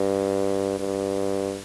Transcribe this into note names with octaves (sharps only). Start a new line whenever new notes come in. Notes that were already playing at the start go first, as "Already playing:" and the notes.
Already playing: G2
G2